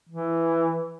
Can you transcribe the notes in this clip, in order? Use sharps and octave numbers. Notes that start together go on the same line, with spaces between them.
E3